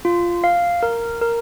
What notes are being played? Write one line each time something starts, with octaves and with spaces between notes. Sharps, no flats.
F4
F5
A#4
A#4